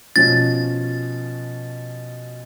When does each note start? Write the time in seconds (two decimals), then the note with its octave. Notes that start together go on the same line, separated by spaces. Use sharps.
0.16 B2 F3 C#4 A6